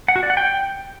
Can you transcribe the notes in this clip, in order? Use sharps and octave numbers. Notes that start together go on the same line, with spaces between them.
F#5
F#4
D5
F#5
G5